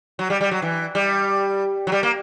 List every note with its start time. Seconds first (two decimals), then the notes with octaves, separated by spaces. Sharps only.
0.19 F#3
0.30 G3
0.41 G3
0.51 F#3
0.62 E3
0.95 G3
1.87 F#3
1.92 G3
2.03 A#3